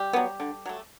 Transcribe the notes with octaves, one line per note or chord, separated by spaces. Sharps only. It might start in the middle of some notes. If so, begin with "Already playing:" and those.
Already playing: G3 G4
F#3 B3
D3
F#3 A3